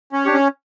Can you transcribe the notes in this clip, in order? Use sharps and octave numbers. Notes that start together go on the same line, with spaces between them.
C#4
D4 G4 C#5
C#4